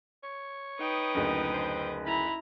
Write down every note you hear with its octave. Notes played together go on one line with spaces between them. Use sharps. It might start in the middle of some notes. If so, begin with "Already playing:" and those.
C#5
D#4 B4 G5 D#6
F#1 D2
C5
E4 A#5 B5